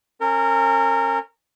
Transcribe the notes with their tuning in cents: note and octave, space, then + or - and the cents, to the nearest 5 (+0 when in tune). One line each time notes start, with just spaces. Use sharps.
C#4 -30 A#4 -25